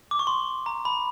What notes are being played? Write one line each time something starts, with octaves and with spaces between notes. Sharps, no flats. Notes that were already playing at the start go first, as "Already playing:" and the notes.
D6
C#6
C6
A#5
B5